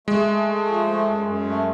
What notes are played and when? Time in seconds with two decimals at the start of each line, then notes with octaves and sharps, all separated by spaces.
0.07 G#3 A3
0.28 A3
0.48 A3
0.67 F3
0.87 A3
1.08 F#2
1.28 F#2
1.48 A3